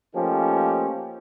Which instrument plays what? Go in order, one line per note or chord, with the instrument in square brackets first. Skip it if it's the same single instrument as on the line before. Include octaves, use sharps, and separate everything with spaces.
[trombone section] F3 A3 A#3 C#4 D#4 G4